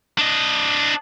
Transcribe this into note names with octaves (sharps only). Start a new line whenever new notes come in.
D4 D#5